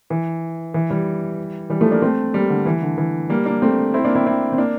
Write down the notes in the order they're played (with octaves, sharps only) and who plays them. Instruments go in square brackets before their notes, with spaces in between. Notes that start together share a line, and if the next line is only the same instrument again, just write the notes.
[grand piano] E3
E3
E3 G3
E3 G3
F3 A3
A#3 D4
A3 C4
G3 A#3
D3
E3
D3
E3
G3 A#3
A#3 D4
A3 C4
C4 E4
A#3 D4
C4 E4
C4 E4
C4
A#3 D4